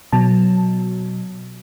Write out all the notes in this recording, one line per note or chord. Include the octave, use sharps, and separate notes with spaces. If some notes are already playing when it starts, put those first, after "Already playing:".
B2 F#3 A5